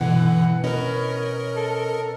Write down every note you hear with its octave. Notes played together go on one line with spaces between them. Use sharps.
G2 B2 D3 E3 F#5
C#4 A#4 B4 C#5 D#5
A4